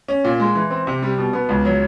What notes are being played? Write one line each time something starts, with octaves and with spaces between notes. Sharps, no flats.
C#4
A#2
G#3
E3
C4
C3
G3
B2
B3
C#2
F#3